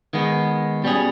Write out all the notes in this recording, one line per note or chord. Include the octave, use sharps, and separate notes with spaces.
D#3 G#3 B3
B2 G3 C#4 G#4